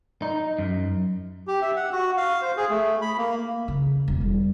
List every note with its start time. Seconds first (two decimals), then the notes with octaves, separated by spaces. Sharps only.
0.22 D#4
0.58 F#2
1.47 G4
1.62 E5
1.76 F#5
1.93 F#4
2.17 F5
2.42 C5
2.57 G#4
2.70 A3
3.02 B5
3.18 A#3
3.68 C#3
4.08 E1
4.21 G3